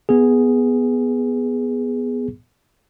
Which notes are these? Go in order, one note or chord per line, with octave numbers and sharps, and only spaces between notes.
B3 G#4